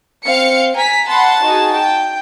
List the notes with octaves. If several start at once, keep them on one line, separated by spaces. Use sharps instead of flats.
C4 F5 C#7
G#5 A#5 B6
F#5 A5 B5 C6
D#4 F#4 G#4
G5